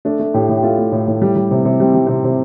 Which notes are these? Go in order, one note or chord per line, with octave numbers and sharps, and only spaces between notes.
A3 D4
A3
A2 G4
A2
G4
A3 F4
A3
A2
A2
G3
G3
C3
C3
G3 C4
G3
C3 C4
C3